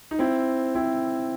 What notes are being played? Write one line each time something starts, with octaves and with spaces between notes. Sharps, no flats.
D#4
C4 E4
C4 E4